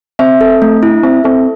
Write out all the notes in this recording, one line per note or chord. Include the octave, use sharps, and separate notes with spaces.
C4 E5
A4
A3
E4
D4
C4 E5
C4 A4